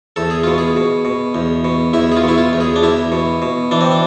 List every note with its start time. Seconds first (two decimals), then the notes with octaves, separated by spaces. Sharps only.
0.16 E2 A4
0.30 G#4
0.44 B2 F4
0.58 G#4
0.77 B2
1.05 B2
1.35 E2
1.65 B2
1.93 E2 E4
2.12 G#4
2.17 F4
2.24 B2 E4
2.38 F4
2.53 E2
2.60 G#4
2.76 D4
2.83 E2 E4
3.12 B2
3.42 B2
3.71 E3 D4
3.81 C4
3.91 D4